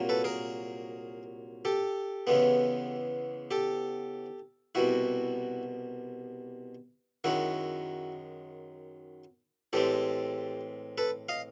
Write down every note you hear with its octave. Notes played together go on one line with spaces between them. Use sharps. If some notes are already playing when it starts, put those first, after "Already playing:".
Already playing: C2 A#2 F#3
A4 B4
G#4 A#4
G4 A4
E2 C#3 E3 G#3 B3
G4 A4
C2 B2 G3 E4 F#4
F#2 D#3 G#3 E4 F#4
A2 E3 G#3 C4 G4 A4
A4 B4
D#5 F5